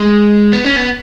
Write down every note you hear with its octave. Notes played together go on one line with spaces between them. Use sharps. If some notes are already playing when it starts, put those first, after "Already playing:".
Already playing: G#3
B3
C#4
B3